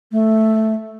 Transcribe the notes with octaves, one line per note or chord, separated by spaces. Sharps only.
A3